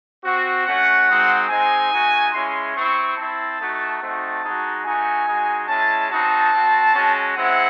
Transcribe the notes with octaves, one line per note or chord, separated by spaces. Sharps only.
C4 F#4
A3 C#4 F#4 F#5
G#3 C4 D#4 F#4
G#3 C4 D#4 G#5
A3 D#4 F#4
G#3 C#4 E4 C6
C4 E4 C#6
C4 E4 A5
A3 D#4 F#4
A3 C4 D#4 F#4 A5
G#3 D#4 F#4
A3 D#4 F#4 G#5
G#3 D#4 F#4
G#3 C#4 E4 A5
C4 D#4 F#4 A5
C4 F#4
G#3 C#4 F#4
G#3 C4 E4 F#5